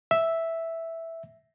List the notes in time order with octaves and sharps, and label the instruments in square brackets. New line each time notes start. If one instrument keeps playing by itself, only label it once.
[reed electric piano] E5